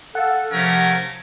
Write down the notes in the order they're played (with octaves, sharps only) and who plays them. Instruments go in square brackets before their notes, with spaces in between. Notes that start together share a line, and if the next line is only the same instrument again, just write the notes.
[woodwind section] A4 [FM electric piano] F5 F#5
[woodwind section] C3 F3 [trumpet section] A3 C#4 A#4